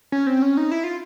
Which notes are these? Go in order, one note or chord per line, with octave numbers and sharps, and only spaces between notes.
C#4
C4
C#4
D#4
E4
F4